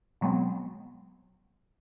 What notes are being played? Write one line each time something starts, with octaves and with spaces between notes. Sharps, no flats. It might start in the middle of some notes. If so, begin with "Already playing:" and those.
B2 F#3 G#3 B3 C4